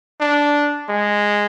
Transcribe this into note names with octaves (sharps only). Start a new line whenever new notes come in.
D4
G#3